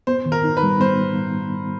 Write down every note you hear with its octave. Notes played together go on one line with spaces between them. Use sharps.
B3 C5
D#3
A#4
D#4
B4
G3
B3 C5